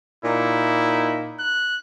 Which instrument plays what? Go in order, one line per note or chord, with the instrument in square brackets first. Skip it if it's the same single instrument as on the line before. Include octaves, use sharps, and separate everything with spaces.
[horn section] A#2 D#4 [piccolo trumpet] E4
[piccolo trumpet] F#6